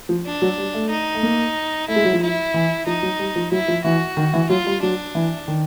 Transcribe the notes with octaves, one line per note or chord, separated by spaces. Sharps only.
F3
D4
F#3
G3
A3
D#4
A3
A#3
A3 E4
G#3
F#3
F3
E4
E3
F3 D#4
F#3
G3
F3
F#3 E4
F3
E3 F#4
D#3
E3
F#3 F4
G3
F#3 D4
E3
D#3